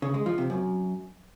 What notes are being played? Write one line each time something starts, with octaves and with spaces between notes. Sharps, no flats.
C#3
G#3
F3
C3
F#2